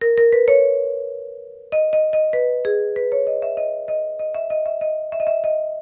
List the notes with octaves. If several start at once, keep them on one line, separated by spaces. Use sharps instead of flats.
A#4
A#4
B4
C#5
D#5
D#5
D#5
B4
G#4
B4
C#5
D#5
E5
D#5
D#5
D#5
E5
D#5
E5
D#5
E5
D#5
E5
D#5